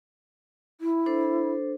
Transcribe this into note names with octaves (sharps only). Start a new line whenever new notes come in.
E4
D4 A4 C5